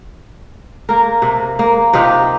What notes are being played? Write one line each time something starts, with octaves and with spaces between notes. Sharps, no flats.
A#3 A#4
C3
A#3
C3 D#4 F4 G4